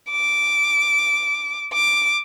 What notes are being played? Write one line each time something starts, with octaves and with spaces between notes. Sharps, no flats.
D6
D6